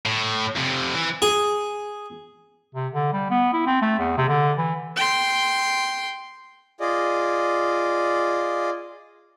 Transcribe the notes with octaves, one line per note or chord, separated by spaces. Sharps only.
A2
F2 C3
E3
G#4
C3
D3
G3
B3
E4
C4
A3
E2
C3
D3
E3
G5 C6
F4 G#4 D5 D#5